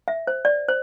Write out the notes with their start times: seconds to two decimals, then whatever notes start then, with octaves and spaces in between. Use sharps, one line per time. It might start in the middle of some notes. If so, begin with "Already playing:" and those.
0.08 E5
0.27 C5
0.45 D5
0.68 C5